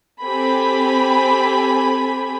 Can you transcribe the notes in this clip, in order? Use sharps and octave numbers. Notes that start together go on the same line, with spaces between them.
C4 G4 A4 G#5 B5